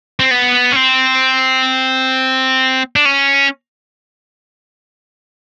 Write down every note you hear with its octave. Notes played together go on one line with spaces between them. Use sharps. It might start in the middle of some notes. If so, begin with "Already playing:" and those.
C4
B3
C#4
C4
D4
C#4